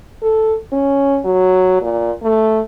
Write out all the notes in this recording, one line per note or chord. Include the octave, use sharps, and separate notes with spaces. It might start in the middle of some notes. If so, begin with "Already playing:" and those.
A4
C#4
F#3
A#2
A3